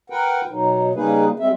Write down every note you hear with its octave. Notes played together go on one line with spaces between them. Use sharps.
A#4 B4 F#5 G5
B2 F#3 D#4
C#3 G3 A#3 D#4 G#4 B4
G3 G#3 C4 E5